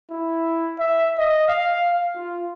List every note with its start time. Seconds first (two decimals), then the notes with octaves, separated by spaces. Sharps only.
0.10 E4
0.79 E5
1.18 D#5
1.48 F5
2.15 F4